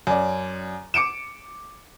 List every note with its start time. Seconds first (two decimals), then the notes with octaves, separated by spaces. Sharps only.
0.07 F#2 D5
0.94 D6 C#7 D7 E7